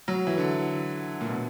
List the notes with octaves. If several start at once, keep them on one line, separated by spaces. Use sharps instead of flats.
F#3
E3
D3
A#2
B2